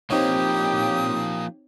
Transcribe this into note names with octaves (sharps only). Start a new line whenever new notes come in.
F3 A#3 C4 D#4 G4 C#5 D#6